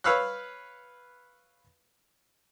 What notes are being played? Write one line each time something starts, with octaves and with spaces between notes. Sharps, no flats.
B4 C#5 F5 B5 E6 F#6